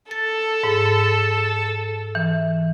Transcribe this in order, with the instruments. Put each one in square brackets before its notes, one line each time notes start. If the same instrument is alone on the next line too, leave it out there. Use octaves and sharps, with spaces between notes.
[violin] A4 [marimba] A6
[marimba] G#2
E3